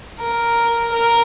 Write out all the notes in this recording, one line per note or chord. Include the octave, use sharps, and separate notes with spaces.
A#4
A#4